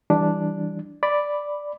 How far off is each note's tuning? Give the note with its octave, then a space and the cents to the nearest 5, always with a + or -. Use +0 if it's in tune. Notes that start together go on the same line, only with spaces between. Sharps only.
E3 +0 G3 +0 D4 +0
D5 +0 B5 +0